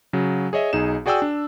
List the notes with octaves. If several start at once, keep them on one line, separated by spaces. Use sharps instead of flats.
C#3 F#3
G#4 C#5 D#5 E5
B1 D#4 G#4 E7
F#4 G#4 D5 G5 G#5 E6
D4